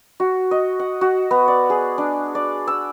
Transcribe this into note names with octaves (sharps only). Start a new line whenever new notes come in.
F#4
D#5
F#5
F#4
B3
D5
G#4
D4
D5
E6